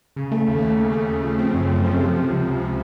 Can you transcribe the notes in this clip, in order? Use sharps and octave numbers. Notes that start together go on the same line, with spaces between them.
C#3
A3
D#2
D#2
C#3
A3
C#3
F3
C4
F#2
C#3
F3
C3
F3
C#2
C#2
C3